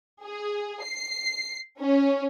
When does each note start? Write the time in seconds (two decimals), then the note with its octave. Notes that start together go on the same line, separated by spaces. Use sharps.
0.24 G#4
0.83 C7
1.80 C#4